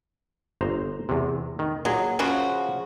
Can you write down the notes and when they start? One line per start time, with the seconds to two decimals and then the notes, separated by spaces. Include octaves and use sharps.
0.61 G1 C5 A#5
1.09 E2 C3
1.59 D#3
1.85 A#2 F#3 G#4
2.19 C#3 F3 F#4